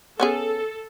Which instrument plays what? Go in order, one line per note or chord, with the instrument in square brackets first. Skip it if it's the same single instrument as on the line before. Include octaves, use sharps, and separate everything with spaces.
[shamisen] B3 C#4 G#4 [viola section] A4